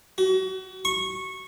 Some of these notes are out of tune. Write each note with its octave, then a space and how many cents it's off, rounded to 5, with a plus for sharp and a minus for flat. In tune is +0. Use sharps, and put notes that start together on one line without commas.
F#4 +35
C#6 -15